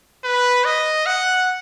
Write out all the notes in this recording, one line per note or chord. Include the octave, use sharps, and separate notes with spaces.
B4
D#5
F#5